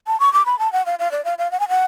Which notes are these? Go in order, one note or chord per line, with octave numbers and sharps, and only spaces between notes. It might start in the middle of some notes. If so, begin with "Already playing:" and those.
A5
C#6
D6
B5
A5
F#5
F5
F5
D5
F5
F5
F#5
G#5
F#5